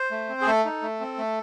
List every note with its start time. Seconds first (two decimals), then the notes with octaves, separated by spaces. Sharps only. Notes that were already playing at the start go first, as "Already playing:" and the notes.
Already playing: C5
0.11 A3
0.29 C4
0.41 G#4
0.46 A3 A4
0.65 D#4
0.82 A3
1.00 C4
1.18 A3